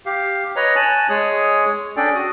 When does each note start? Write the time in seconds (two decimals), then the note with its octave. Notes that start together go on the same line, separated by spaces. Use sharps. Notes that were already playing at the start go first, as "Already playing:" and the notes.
0.06 G4 F5
0.56 B4 C#5 D#5 A#5
0.76 G#5 A5 F#6
1.09 G#3 G#4 C#5 D#6
1.97 C#4 D4 G#4 A4 D5 G5
2.15 F#4 D#6